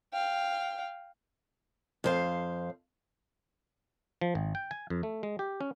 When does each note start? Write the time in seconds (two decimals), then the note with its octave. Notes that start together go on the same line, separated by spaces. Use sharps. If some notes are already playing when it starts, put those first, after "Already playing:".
0.13 F5 G5
2.04 F2 C5 F5
4.21 F3
4.35 G#1
4.55 G5
4.71 G#5
4.90 F2
5.03 A3
5.23 G#3
5.39 G4
5.61 C#4